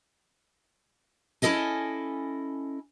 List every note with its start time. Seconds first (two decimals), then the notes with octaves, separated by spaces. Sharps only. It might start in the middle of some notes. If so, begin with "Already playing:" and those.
1.42 C#4 E4 F#4 A4 D#5 G#5